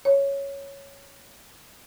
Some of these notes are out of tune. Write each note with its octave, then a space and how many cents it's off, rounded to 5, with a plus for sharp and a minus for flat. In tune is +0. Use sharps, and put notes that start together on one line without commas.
C#5 +0